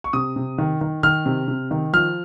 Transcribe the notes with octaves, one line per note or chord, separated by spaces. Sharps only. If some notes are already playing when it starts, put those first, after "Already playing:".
C#6
C3 D#6
C3
D#3
D#3
D#3 F6
C3
C3
D#3
F3 F6